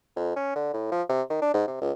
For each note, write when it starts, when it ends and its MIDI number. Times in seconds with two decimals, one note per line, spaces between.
0.16 0.35 41
0.36 0.54 61
0.55 0.73 50
0.73 0.91 45
0.91 1.02 53
1.09 1.22 48
1.30 1.41 51
1.42 1.53 62
1.54 1.65 44
1.67 1.80 48
1.81 1.92 37